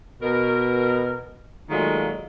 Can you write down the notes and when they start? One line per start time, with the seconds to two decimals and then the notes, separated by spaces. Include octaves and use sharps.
0.22 B2 A#4
1.70 A#2 D#3 F#3 G#3 A3 F4